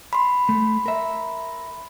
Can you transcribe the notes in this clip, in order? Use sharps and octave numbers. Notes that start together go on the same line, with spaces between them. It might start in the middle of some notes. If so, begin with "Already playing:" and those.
B5 C6
A3
A#4 E5